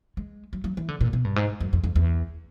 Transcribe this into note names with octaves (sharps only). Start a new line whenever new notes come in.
G#3
F#3
F#3
E3
D3
A#2
B2
G2
G#2
F#2
F2
F2
E2